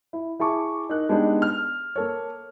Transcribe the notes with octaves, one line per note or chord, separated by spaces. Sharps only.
E4
E4 G#4 A5 C#6 D6
D#4 A#4 F#6
G#3 B3 D4 D#4 G4
F6
A#3 A4 C#5